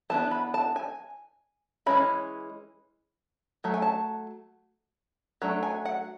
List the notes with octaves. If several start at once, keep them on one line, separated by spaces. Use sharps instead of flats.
E3 B3 D4 A5
B5
A5
G#5
E3 G#3 C#4 B5
F#3 A3
G#5
A5
F#3 A3 D4
G#5
F#5